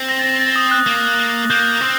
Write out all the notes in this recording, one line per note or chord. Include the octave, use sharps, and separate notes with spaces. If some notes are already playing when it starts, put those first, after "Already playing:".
Already playing: C4
A#6
A6
A#6
A6
D#6
F#6
A#3
A#3 G6
C4